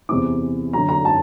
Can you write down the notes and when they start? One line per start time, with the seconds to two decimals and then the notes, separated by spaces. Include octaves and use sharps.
0.09 E2 C3 E3 D6
0.73 F#2 D3 A#5
0.89 A#5
1.05 A5